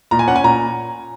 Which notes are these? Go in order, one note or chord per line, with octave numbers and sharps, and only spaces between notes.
A#2 A#5
G#5
C#4 F#5
G#5
A#2 A#5